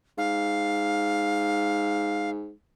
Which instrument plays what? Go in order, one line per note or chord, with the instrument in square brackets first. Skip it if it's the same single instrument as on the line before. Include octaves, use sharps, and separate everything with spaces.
[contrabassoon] G#2 [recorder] F5